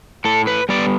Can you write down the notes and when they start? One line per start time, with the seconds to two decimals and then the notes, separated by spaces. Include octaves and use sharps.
0.25 A2 A4
0.47 B4
0.69 G3 B3 D5